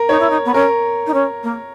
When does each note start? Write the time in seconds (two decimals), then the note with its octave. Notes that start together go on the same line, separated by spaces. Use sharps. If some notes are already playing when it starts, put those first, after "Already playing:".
Already playing: A#4
0.09 D#4 C#5
0.20 E4
0.30 D#4
0.45 B3
0.54 C#4 A#4
1.07 D#4
1.14 C#4
1.43 A#3